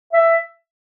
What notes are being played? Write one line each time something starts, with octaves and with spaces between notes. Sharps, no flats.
E5